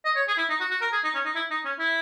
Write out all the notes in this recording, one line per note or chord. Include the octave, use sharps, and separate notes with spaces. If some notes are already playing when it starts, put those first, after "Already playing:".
D#5
C#5
G#4
E4
D#4
F#4
F#4
A#4
G#4
D#4
C#4
D#4
E4
D#4
C#4
E4